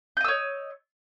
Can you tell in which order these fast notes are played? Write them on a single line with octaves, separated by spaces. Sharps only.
G6 D#5 E6 C#5